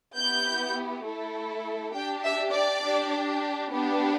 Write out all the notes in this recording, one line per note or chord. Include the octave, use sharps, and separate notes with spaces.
B3 E4 G4 G6
A3 E4 A4
D4 G4 G5
E5
D5
D4 G4
B3 D4 G4